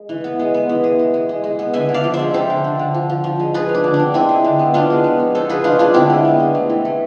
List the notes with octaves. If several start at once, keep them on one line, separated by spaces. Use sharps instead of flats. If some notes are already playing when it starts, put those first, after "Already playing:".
Already playing: G#3
E3
B3
G#3
B3
E3
G#3
G#3
G#3
G#3
G#3
B3
D3 E5 G#5
D3
D5 F5
F3
C5 E5
G#3
C4 A4 C5
D3
D3
D3
F3
F3
F3
G#3
F3 G#4 B4
F3
D4
D3
D4
C4
G#3 C4 E4
G#3
D3
B3
B3 D4 F4
G#3
B3
F3
B3 A4 C5
F3 G#4 B4
G#3 D4 F4
G#3 D4 F4
D3 C4 E4
G#3
B3
G#3
A3
E3
A3